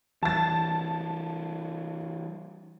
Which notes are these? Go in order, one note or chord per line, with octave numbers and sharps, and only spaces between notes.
E3 G3 A5 A6